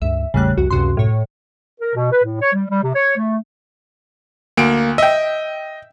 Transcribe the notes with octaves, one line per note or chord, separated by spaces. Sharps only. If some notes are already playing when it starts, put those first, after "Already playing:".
C#2 G2 E5
A1 E2 C#3 G3 A3 F#6
C2 F2 F#4
C#2 F#2 C3 F#4 C6
A2 C#5
A#4
B2
B4
A2
C#5
G3
G3
C3
C#5
A3
D2 A#3 D7
D#5 E5 G5